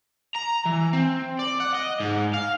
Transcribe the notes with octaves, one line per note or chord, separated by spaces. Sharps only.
A#5
E3
C4
D5
F#5
D#5
G#2
F5